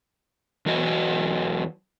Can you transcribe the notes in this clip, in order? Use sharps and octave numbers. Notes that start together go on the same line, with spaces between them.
E2 E3 F#3 F#4 B4 D#5